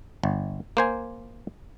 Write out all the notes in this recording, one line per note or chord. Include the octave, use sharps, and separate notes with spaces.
G1
A#3 C5 G#5